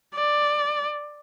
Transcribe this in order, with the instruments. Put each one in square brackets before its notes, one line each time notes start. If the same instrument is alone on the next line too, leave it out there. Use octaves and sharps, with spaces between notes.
[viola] D5